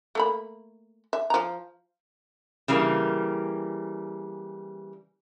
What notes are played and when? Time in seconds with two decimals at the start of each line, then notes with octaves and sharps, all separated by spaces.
0.15 A3 A#3 B5
1.13 E5
1.30 F3 A#5
2.68 C#3 E3 G3 A#3